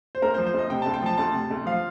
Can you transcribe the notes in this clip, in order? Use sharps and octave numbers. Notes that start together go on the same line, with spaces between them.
C5
D2 A#4
C5
F3
C5
D2 D#5
C3 G5
A5
D2
G5
F3 A5
D2 A5
C3
D2
F3 F5